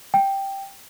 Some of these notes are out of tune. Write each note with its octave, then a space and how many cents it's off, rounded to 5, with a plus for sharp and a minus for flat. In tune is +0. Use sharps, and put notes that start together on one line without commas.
G5 +0